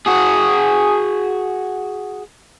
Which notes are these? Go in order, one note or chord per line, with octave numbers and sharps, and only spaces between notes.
F#4 G#4